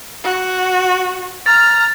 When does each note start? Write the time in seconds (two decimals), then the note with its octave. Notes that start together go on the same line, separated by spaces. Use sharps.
0.23 F#4
1.46 A#5 F6 A6